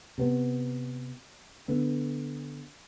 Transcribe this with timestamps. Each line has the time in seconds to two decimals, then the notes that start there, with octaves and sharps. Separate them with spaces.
0.18 C3 B3
1.68 D3 B3